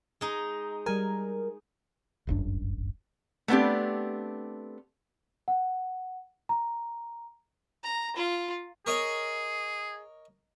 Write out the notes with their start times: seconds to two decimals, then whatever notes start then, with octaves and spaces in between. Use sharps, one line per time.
0.21 G#3 D#4
0.86 G3 A#4 G#5
2.27 D1 G1 F#2 D4
3.48 A3 B3 C4 D4 G4
5.48 F#5
6.49 A#5
7.83 A#5
8.16 F4
8.86 G#4 A#4 C#5 D#5